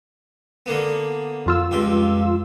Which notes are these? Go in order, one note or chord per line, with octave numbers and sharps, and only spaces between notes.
D3 A#3 B3
F2 F4 E6
C#2 G2 G4